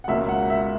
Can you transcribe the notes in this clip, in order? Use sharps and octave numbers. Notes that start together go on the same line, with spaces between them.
F#5
C#2 B2 A#3 C#4 E5
F#5
E5